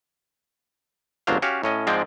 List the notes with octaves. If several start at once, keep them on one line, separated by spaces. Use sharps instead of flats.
G1 C#2 F#3 D4 C5 F5
C#4 F#4 G4 F5
A2 C#4 D#5
G#2 F3 G#3 C4 D5 G5